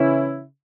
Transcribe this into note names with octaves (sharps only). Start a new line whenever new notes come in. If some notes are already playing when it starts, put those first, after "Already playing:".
Already playing: C#3 E3 C#4 E4